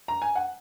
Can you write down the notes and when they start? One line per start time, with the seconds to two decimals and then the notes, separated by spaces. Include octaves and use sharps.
0.08 A#5
0.22 G#5
0.36 F#5